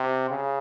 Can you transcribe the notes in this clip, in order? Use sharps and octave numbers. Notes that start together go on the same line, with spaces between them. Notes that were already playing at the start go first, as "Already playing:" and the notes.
Already playing: C3
C#3